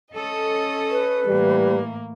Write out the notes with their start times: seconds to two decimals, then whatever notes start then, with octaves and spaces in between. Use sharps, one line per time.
0.14 C#4 A4 D#5 D#6
0.91 B4
1.27 A2 E3 G3 A#3